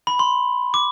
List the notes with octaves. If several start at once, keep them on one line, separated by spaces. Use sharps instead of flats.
B5
C6
D6